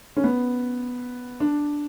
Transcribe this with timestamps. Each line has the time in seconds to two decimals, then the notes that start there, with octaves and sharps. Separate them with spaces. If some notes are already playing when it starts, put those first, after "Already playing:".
0.17 C#4
0.24 B3
1.40 D4